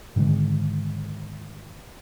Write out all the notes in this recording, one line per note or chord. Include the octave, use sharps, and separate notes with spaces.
G#2 D3 D#3 G#3